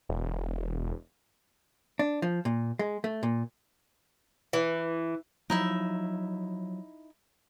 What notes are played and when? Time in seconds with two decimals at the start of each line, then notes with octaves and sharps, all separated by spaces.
0.09 E1
1.99 D4
2.22 F3
2.45 A#2
2.79 G#3
3.04 A3
3.23 A#2
4.53 E3
5.50 F3 F#3 D#4 E4 E5